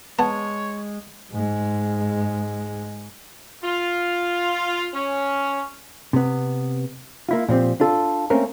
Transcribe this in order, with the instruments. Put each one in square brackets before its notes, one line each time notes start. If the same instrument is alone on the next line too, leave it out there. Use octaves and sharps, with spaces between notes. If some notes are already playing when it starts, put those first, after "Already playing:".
[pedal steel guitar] G#3 [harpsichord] B3 [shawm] C#5 [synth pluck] A5
[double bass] G#2 G#3
[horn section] F4
C#4
[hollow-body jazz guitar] C3 B3
A#3 E4 F4
A#2 F3 C4 G4
D4 F4 A4
A3 A#3 C4 C#4 A#4